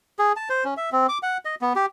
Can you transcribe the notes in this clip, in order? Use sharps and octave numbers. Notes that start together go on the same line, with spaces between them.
G#4
A5
C5
C#4
E5
C4
D6
F#5
D#5
B3
G4